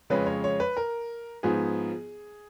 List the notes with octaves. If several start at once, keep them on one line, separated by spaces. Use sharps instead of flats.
F2 C#3 G#3 C#4 B4
C#5
C#5
B4
A#4
G#2 F3 B3 G#4